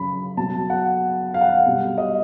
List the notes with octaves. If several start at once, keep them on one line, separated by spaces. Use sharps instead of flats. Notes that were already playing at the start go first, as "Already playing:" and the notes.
Already playing: F#2 C#3 F#3 B5
B2 F#3 A5
F#5
F5
F#5
F5
B2 G3
D#5